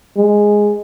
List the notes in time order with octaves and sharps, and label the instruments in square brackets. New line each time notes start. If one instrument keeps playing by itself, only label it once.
[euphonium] G#3